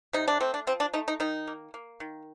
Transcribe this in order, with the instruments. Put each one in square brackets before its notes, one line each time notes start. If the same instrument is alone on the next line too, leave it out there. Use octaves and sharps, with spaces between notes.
[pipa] C3 D#4
D4
A3 C4
D4
F3 C4
D4
A3 D#4
D#4
D#3 D#4
A#3
A#3
D#3